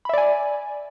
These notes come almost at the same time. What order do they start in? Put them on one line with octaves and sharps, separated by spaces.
B5 E5 D5 G#5